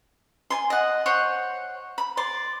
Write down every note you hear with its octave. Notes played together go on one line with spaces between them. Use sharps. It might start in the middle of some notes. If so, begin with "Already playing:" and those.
G#5 C6
D#5 F#5
C5 C#5 F#5
B5
D5 C6